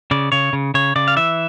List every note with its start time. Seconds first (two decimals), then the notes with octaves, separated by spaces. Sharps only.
0.11 C#3 D5
0.32 C#3 C#5
0.53 C#3
0.74 C#3 C#5
0.96 C#3 D5
1.08 F5
1.16 E3 E5